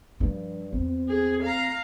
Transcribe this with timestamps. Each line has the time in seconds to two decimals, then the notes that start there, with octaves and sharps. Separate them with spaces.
0.20 G2 F3
0.73 E2 C4
1.08 G#4
1.43 F5 A#5